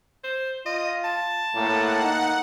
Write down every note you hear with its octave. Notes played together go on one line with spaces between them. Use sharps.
C5
F4 D#5
A5
A2 A#3 F#5
D#4